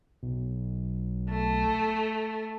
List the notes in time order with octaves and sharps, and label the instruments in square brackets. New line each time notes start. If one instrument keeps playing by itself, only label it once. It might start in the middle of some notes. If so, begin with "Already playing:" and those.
[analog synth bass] B1
[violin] A3